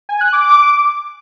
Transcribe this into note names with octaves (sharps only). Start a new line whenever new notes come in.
G#5
F#6
D6